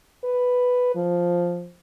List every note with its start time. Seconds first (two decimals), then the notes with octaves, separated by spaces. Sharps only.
0.24 B4
0.95 F3